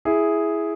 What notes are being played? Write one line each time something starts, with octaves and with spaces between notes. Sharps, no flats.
E4 G#4